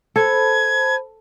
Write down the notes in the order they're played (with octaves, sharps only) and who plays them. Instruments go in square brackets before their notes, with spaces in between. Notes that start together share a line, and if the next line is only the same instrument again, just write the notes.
[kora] A4 [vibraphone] C5 A5 B5 [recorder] G#6